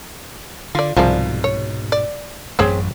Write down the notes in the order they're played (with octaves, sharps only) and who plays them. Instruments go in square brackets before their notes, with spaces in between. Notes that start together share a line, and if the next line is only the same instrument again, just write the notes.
[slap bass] D3 [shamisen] F4 D5
[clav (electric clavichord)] C2 F3 A5 [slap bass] G#2 B2 [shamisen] F4 G#4 D5
[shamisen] C#5
D5
[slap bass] A1 F#2 A3 [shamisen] C4 G#4 C#5